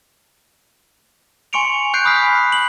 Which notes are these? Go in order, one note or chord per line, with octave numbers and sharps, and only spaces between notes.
G#5 C6 C#6 C#7 D7 F7
G#5 F#6 G6 C7 D7
B5 D#6 F6 F#6 B6 C7
F#7